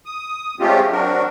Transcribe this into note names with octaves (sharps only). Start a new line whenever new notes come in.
D#6
G#3 A3 C4 C#4 F4 G4
F#3 C4 D4 F#4 A#4